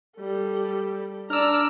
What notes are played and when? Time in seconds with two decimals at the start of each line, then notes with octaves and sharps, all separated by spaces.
0.19 G3 A4
1.30 D4 D5 A#5 E6 F6